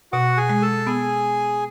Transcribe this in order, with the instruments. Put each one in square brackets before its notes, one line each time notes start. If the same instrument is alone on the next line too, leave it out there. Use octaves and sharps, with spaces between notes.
[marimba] B2 [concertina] F#4 F#5
[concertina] G#4 G#5
[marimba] G#3
[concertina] A4 A5
[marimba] B3 [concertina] G#4 G#5